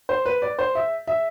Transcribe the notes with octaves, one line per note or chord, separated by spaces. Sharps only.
C5
B4
D5
C5
E5
E5